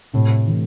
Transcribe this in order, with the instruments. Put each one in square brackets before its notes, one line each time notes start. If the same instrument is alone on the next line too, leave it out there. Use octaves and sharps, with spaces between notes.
[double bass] A2 [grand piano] C3
[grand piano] E3 A3